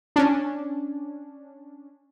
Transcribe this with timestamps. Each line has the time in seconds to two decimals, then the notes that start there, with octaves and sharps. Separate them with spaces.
0.16 C#4 D4